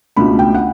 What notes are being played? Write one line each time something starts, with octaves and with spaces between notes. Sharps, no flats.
C#2 B2 A3 D4 B5
G5
F#5